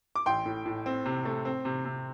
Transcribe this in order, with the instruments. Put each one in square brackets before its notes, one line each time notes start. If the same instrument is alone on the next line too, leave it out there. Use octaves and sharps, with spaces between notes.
[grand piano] D6
A1 G5 C6
A2
A2
C4
C3
A3
C4
C3
C3